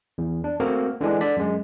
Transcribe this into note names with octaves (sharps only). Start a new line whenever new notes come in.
E2
D4
A3 A#3 C4 F#4 A#4
D3 E3 G#3 D4
D3 D5 B6
F#2 G#3